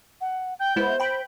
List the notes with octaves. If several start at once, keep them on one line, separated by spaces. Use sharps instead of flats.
F#5
G5 G6
G#3 B3 E4 C5
G5 B5 G6